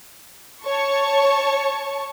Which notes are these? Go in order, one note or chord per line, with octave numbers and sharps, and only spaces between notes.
C#5 A5 C#6